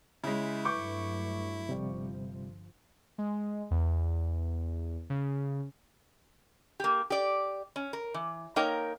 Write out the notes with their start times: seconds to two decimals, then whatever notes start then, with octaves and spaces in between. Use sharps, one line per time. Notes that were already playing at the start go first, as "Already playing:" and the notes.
0.24 C#3 G#3 E4
0.65 G2 F#3 A3 B4 C#6 D6 G6
1.69 G1 C3 F3 G3
3.18 G#3
3.71 E2
5.10 C#3
6.80 A#3 G4
7.10 G4 D5
7.76 C#4
7.93 A#4
8.14 E3
8.56 A#3 D#4 A#4 C#5 G5